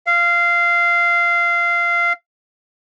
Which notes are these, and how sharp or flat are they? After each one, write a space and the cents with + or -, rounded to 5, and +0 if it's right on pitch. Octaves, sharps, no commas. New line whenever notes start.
F5 -15